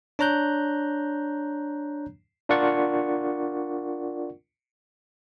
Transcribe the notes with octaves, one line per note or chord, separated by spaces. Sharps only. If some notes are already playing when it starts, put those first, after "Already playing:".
D4 C#5 A#5 F#6 G6
D4 F4 A#4 D5 F#5 C#6